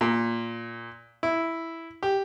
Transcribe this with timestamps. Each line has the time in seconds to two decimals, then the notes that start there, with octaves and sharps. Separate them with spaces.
0.01 A#2
1.23 E4
2.03 G4